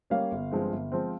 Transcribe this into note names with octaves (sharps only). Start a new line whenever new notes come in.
G3 A#3 C#4 F5
G1
G2 F3 G#3 C4
G1
F3 G#3 C4